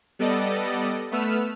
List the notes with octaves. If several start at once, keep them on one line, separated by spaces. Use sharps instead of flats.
G3 B3 A4 D5 D#5
A3 B3 B4 E6 F6